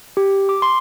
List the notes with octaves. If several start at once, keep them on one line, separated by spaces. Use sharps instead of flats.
G4
D6
C6